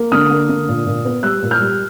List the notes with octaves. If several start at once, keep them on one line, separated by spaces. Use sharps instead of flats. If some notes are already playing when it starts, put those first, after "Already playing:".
Already playing: A#3
D3 D#6 F6
A#3
D3
A#2
A#2
B3
G3 E6 F#6
A#2
F6 G6
G3